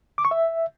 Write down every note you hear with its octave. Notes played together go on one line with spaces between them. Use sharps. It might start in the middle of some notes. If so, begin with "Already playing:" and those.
D6
C#6
E5